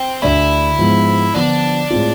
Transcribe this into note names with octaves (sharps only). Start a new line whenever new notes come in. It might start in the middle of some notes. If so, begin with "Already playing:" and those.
Already playing: C4
D2 D3 A3 D4 E4
G#2 F3 G#3 B3
D3 F3 B3 D4 F4
A2 G#3 C4 F4